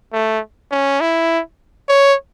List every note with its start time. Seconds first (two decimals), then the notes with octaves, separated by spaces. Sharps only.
0.13 A3
0.71 C#4
1.01 E4
1.89 C#5